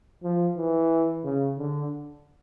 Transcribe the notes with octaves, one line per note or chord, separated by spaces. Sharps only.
F3
E3
C#3
D3